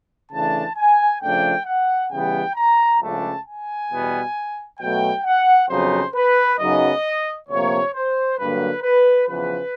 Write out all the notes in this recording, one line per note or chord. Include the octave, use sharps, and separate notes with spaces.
C#3 E3 A3 D4 A5
G#5
C#3 F3 A3 D4 G5
F#5
C#3 E3 G3 B3 G5
A#5
C#2 C#3 F3 A3 D4 A5
G#5
E2 B2 G3 B3
B2 F#3 A3 G5
F#5
F2 C#3 F#3 B3 D#4 C5
B4
F#2 C#3 F#3 B3 D#4 D#5
D2 C3 F3 A#3 C#5
C5
G2 D3 F#3 A#3 B4
B4
E2 C#3 F3 B4